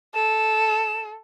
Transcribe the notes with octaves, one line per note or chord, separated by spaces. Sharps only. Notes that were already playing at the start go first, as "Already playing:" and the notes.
A4 E7